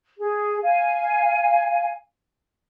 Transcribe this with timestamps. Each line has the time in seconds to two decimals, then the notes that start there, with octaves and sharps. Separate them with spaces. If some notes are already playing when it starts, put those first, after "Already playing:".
0.18 G#4
0.62 F5 G#5